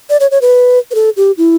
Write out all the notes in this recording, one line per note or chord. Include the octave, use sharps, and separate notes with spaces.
D5
C#5
C#5
B4
B4
A4
G4
E4